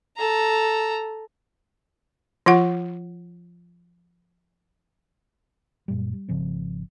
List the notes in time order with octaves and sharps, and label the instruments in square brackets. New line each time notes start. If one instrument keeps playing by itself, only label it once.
[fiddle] A4 A#5
[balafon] F3 F4 F#5
[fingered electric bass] F#2 A#2 G3
G3
G#1 C#3 F3 C4